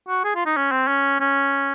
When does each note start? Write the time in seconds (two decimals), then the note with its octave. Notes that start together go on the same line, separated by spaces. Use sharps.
0.09 F#4
0.24 G#4
0.35 F4
0.46 D#4
0.57 C#4
0.72 C4
0.88 C#4
1.20 C#4